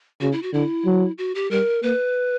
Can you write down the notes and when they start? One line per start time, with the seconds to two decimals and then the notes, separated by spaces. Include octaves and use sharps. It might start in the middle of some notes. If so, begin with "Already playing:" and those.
0.21 C#3 F#4
0.32 E4
0.43 F#4
0.53 D3 E4
0.85 F#3
1.18 F#4
1.35 G4
1.51 G3 A#4
1.83 A#3 B4